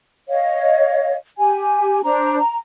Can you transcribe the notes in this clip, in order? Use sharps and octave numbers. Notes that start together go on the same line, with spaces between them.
C#5 D#5 F5
G4 G#5
D4 C5 A#5
A#5